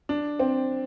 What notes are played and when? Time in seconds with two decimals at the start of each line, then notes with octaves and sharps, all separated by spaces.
0.09 D4
0.39 C4